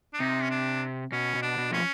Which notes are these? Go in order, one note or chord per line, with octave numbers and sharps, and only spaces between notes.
D4
C3 D#4
C#4
D4
B2 C#4
B2
D4
B2
F3 C#4